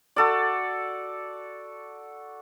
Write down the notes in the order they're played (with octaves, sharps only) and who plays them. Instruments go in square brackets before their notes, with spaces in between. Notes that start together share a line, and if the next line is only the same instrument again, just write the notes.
[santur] F#4 A4 D5